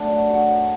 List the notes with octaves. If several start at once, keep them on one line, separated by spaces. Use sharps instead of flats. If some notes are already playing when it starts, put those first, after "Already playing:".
Already playing: F#2 A3 D4
F#3
C#3 F#4
F#2